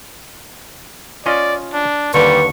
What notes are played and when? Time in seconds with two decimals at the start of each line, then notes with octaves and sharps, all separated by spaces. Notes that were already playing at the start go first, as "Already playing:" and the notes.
1.26 C#4 F4 D5 D#5
1.74 D4
2.14 D#2 D3 G3 B4 C#6